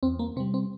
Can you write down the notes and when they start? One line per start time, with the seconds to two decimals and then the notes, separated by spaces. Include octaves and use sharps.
0.03 E2 C4
0.19 A#3
0.36 C3 C4
0.40 G3
0.54 C4